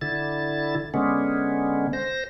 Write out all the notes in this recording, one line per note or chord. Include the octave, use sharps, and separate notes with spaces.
D3 E4 A6
D3 G#3 B3 C#4
C5 A#6